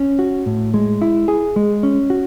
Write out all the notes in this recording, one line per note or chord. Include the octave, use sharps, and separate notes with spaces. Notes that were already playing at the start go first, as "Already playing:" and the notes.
Already playing: C#4
F#4
A2
G#3
E4
G#4
G#3
C#4
F#4